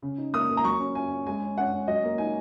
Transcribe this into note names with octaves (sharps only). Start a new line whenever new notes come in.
C#3
D#4
A#3 D#6
A#3
A#5
F#3 C#6
C#4
C#4 G#5
C#4
G#3 G#5
C#4
C#4 F#5
C#4
F#3 D#5
A#3
D#4 G#5